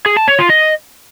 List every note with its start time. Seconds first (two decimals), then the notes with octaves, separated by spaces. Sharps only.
0.06 G#4
0.17 A5
0.28 C#5
0.39 F4
0.50 D#5